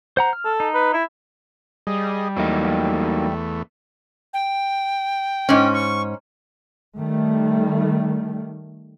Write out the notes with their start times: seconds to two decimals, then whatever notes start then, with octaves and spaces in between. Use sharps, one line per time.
0.17 C5 F#5 A#5
0.33 F6
0.45 A4
0.60 D#4
0.74 B4
0.94 E4
1.87 G3 G#4 D#5
2.37 E2 F#3 A3 A#3 D#4
4.34 G5
5.49 G#2 C#4
5.73 C#6
6.97 D#3 G3 A3